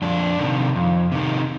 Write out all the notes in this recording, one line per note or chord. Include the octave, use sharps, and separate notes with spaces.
F2 D4
C3 D#3
F2
C3 D#3